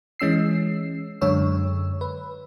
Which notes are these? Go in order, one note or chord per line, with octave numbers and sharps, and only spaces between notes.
E3 G#3 C#4 E6 C7
F#2 D3 G#3 C#5 E6
B4